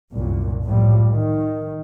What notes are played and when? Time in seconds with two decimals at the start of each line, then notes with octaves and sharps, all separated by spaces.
0.14 C2 F#2 A#2
0.64 A2 F3 G3
1.11 D#3